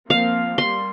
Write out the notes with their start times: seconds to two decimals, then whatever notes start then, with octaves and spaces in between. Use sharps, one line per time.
0.10 F3 A#3 C4 F5
0.58 G3 A#3 C6